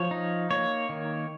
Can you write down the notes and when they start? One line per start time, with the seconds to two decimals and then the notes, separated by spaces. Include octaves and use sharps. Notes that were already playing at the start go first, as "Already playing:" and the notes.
Already playing: F3 C#5
0.11 D#4
0.50 A#3 C#5
0.89 D#3